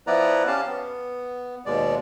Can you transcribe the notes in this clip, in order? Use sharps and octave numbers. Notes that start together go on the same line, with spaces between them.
F3 B3 E4 B4 D5 A#5
C#4 G4 F5 A5
B3
D#2 B2 G#3 D5